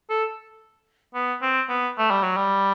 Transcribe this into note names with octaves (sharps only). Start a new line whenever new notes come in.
A4
B3
C4
B3
A3
G3
F#3
G3